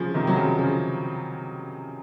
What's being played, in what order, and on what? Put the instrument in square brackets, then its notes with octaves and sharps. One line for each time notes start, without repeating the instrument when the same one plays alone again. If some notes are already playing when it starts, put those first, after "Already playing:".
Already playing: [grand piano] C#3 F3
C3 D#3
F#3
C#3 F3
C#3 F3